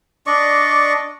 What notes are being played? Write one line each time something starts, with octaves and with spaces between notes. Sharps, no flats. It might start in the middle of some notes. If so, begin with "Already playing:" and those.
D4 D5 D#5 C#6